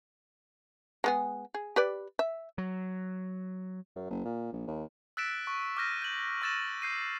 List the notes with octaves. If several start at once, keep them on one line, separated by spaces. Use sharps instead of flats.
G#3 B3 G#4
G#4
G4 B4 D5
E5
F#3
F#2
F#1
A#2
A#1
D#2
E6 F#6 A6 B6 D7 E7
C#6
D6 F6 G6 A#6 D#7
G6 F#7
C#6 E6 A6 A#6 E7
G6 C7 D#7